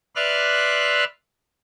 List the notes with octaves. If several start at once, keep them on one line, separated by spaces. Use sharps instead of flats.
B4 D5 E5 C6 F6 F#6